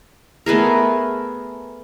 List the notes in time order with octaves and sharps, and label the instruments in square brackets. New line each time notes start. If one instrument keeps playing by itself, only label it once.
[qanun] A3 B3 G#4 A#4